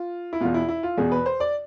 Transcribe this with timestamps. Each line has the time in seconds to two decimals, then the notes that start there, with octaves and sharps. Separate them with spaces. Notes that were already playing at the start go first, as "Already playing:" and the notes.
Already playing: F4
0.33 E4
0.41 E2 B2 F4
0.54 E4
0.69 E4
0.83 F4
0.97 E2 B2 G#4
1.12 B4
1.26 C5
1.40 D5